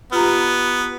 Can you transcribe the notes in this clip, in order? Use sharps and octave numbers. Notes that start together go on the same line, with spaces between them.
B3 F4 G4 A#5